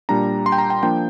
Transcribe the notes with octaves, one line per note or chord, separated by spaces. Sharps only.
A#2 G3 D4 A#5
C6
G5
A#5
G5
F3 A#3 D4 G5